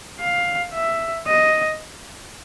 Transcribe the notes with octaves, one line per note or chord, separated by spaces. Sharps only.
F5
E5
D#5